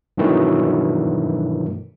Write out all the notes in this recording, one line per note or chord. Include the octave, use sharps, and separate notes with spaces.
G2 B2 D#3 E3 F#3 A3